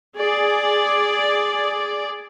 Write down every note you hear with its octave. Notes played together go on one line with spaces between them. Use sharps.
G#4 D5